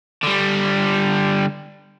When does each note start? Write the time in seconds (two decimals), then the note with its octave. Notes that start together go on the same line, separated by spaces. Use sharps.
0.23 D3 G3